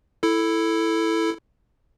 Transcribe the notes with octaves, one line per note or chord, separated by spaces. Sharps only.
E4 A4